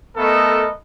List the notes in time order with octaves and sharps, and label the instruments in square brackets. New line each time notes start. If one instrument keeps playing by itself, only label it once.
[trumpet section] A3 B3 A4 A#4 D#5